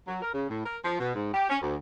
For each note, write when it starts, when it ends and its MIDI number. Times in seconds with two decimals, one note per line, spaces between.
0.07 0.21 54
0.21 0.31 70
0.34 0.47 49
0.49 0.61 45
0.65 0.77 70
0.85 0.97 53
0.99 1.15 47
1.15 1.29 44
1.34 1.46 67
1.49 1.58 61
1.62 1.77 38